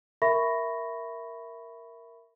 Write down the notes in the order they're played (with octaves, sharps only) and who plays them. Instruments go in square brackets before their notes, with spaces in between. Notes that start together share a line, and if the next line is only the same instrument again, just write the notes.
[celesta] A#4 E5 B5 C#6 A#6